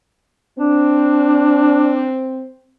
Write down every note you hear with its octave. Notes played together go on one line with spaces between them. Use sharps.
C4 D4